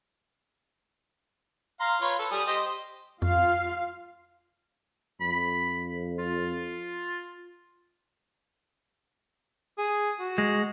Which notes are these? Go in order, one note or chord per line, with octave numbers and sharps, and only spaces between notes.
F5 A#5 C6
F4 B4 C#5
A4 B4
G3 G#4 D#6
G4 C5 D#5
F2 F4 F5
F2 B5
F4
G#4
F#4
G#3